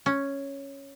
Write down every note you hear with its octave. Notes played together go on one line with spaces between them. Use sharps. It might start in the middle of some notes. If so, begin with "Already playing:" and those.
C#4